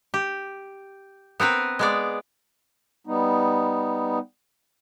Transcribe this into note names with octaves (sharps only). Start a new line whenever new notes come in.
G4
B3 C4 A#4 B4
G#3 B3 D5
G3 B3 D#4